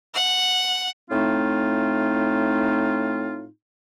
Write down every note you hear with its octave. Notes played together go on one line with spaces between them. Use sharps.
F#5
A2 A3 C4 D#4 F4